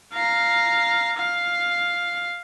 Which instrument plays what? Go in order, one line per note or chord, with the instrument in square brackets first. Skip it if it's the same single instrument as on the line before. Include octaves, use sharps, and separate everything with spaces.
[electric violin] F5 A#5
F5